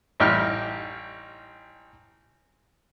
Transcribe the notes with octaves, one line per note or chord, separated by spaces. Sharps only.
A1 G3 D#4 G4 G5 F6